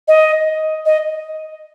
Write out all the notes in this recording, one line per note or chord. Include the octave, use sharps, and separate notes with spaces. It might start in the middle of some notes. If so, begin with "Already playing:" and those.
D#5
D#5